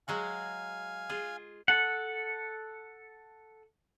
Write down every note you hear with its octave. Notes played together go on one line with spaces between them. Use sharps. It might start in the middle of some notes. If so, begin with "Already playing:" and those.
F#3 G#3 F#4 F5 G#5
F4 G#4
A4 F#5